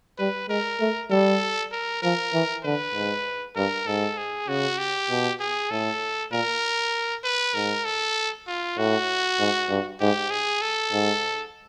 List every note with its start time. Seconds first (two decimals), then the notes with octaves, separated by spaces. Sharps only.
0.18 G3 B4
0.49 G#3 A#4
0.80 A3
1.11 G3 A4
1.72 A#4
2.02 F3 A#4
2.33 E3
2.64 D3 B4
2.95 G#2
3.56 G2 A#4
3.87 G#2 A4
4.18 G#4
4.48 C#3 F#4
4.78 G4
5.10 B2
5.40 G#4
5.70 A2 A4
6.32 A#2 A#4
7.24 B4
7.54 G#2 A#4
7.85 A4
8.47 F4
8.77 A2 F#4
9.39 G#2
9.69 G2
10.00 G#2 G4
10.31 G#4
10.62 A4
10.92 G#2